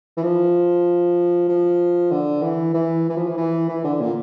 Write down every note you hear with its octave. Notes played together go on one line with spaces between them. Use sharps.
E3
F3
F3
D3
E3
E3
E3
F3
E3
E3
E3
D3
A#2